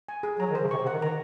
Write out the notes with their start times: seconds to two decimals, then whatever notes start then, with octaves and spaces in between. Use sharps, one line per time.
0.09 G#5
0.23 G#4
0.39 F#3 A#5
0.50 D#3
0.55 C5
0.61 C#3
0.71 C3 C#6
0.81 C3
0.87 D#3 F#5
1.02 D#3 A#5